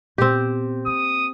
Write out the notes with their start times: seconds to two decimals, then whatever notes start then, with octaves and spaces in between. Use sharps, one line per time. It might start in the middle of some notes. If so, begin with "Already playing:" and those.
0.18 A#2 B3 C4 G4
0.86 A#3 D#6